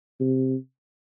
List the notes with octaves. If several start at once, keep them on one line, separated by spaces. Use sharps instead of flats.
C3